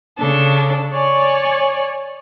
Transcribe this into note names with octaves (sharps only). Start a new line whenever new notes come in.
C#3 D4 A4
C#5 D5 G#5 C#6